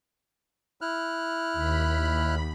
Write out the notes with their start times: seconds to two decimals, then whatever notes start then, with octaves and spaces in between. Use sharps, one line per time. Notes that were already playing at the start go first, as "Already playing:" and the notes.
0.81 E4 F6 F#6
1.53 D#2 B5